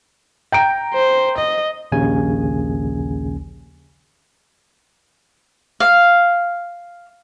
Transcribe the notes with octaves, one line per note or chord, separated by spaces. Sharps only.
G5 A#5 D7
C5
D#5
A#1 D#2 C#3 G#5
F5